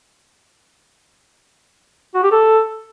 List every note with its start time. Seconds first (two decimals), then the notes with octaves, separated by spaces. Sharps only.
2.14 F#4
2.23 G4
2.32 A4